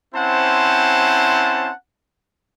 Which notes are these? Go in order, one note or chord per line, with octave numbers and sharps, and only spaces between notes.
C4 C#4 E4 C5 F#5 A5